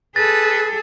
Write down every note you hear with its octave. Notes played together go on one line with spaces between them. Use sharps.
G#4 A4 B4 A6